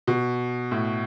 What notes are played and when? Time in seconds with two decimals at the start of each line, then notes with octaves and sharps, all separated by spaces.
0.07 B2
0.71 A2